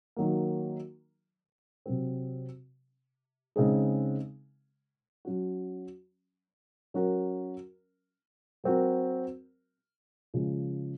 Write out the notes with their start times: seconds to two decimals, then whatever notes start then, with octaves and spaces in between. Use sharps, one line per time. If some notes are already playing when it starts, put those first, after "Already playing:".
0.16 D#3 F#3 A#3
1.86 C3 F#3 C4
3.56 C#3 G#3 C4 D#4 G#4
5.25 F#3 C#4 F#4
6.94 F#3 C#4 F#4 A#4
8.64 F#3 C4 F#4 A#4
10.34 C#3 F3 G#3